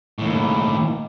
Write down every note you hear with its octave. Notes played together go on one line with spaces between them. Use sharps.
D#2 A2